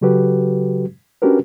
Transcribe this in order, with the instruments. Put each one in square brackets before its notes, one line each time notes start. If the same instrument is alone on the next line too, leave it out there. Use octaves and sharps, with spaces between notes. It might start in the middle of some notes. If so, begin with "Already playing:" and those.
[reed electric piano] C#3 F#3 F#4 G4 A4 B4
C#4 D4 F#4 G4 A#4 B4